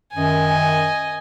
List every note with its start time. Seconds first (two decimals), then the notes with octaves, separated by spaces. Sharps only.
0.14 F#2 D#3 D#5 G#5